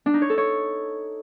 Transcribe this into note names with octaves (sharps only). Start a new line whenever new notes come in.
D4
D#4
C#5
A4
C#5